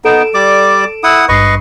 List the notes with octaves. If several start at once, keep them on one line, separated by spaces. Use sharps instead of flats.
B3 D#4 A4 D7 E7
G3 D5 D6
E4 F#5 D#6
G#1 G2 B4 D#5 C#6 C7